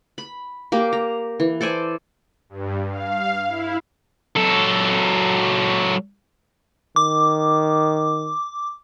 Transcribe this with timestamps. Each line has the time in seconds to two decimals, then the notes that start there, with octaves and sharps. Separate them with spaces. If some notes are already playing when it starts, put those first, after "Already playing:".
0.18 B5
0.72 A#3 G4
0.93 A#5
1.40 E3
1.61 A4 C5 D5 G#5
2.49 G2
2.89 F5
3.48 E4
4.36 F#3 A4
6.96 D#3 D6